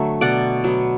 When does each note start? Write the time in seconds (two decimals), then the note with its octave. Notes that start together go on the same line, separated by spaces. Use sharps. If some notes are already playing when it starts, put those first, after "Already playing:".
Already playing: D3 F#3 A3 E5
0.21 B2 D5 F#5
0.64 F#3 B3